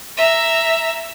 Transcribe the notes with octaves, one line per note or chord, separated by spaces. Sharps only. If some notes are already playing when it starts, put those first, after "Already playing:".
E5 A#5